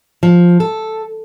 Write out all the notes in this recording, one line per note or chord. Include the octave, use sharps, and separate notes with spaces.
F3
A4